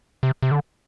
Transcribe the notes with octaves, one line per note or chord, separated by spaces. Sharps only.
C3
C3
D3